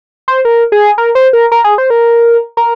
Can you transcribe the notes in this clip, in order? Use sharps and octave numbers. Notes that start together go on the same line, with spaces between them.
C5
A#4
G#4
A#4
C5
A#4
A#4
G#4
C5
A#4
A#4